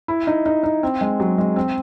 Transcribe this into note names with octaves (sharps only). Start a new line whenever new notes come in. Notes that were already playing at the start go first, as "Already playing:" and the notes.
E4
D#4
D#4
D#4
C4
G#3
F#3
G#3
C4